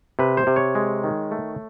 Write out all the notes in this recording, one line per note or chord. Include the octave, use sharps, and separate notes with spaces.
C3 B4
C5
C3
C#5
G#3
D#3
A3